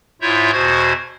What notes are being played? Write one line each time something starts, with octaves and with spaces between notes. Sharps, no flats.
G#2 E4 F4 C#5 E5 G6
E2 B2 F#4 C5 G#6